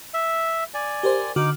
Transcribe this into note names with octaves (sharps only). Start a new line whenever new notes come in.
E5
D5 G#5
G4 A#4 C5
D3 D#4 F#4 D6 F6